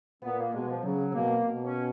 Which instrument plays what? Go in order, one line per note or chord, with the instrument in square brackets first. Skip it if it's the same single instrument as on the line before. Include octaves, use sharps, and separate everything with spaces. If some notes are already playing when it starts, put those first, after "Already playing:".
[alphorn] A#2 [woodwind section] B3
[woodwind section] A#3
[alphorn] B2 [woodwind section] G#3
[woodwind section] F3
[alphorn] C#3 [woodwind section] F#3
[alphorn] B2 [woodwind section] A#3
[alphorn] B2
[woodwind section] C#4